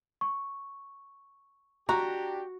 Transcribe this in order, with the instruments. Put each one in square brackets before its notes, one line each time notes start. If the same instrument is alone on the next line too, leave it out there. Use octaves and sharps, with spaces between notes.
[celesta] C#6
[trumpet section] D4 G4 [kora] F#4 [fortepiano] A#5